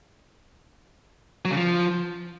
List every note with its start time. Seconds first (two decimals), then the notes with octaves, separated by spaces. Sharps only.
1.45 F#3
1.51 C#3
1.57 F3